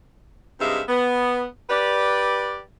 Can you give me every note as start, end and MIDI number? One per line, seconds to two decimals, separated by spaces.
0.61 0.82 43
0.61 0.82 48
0.61 0.82 56
0.61 0.82 63
0.61 0.82 76
0.61 0.82 77
0.89 1.46 59
1.70 2.61 67
1.70 2.61 71
1.70 2.61 74